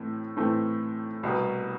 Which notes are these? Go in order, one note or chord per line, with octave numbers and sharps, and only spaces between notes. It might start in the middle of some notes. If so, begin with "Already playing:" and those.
Already playing: A2 E3 A3 C4
A2 E3 A3 C4
C2 B2 G3 B3